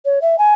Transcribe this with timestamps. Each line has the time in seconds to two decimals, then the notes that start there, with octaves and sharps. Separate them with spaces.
0.05 C#5
0.22 E5
0.38 G#5